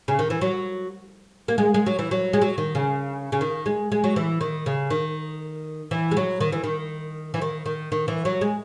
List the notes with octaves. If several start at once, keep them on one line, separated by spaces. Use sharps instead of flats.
C#3
D#3
E3
F#3
A#3
G#3
G#3
F#3
E3
F#3
G#3
F#3
D#3
C#3
C#3
D#3
G#3
G#3
F#3
E3
D#3
C#3
D#3
E3
G#3
F#3
D#3
E3
D#3
E3
D#3
D#3
D#3
E3
F#3
G#3